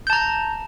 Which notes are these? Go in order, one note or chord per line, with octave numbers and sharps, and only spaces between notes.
A5 A#5 G6